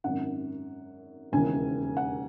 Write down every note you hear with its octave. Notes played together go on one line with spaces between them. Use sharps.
G#1 F#2 D#3 F#5
E1 D#2 C#3 E3 G#5
F#5